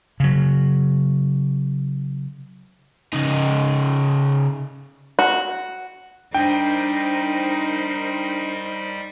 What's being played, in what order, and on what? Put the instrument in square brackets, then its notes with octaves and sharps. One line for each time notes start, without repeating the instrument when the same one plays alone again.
[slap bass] C#3 F#3
[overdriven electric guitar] C#3 D#4
[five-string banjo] F#4
[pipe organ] G3 [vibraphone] D4 [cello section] D#4 A#4 C5 [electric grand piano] G5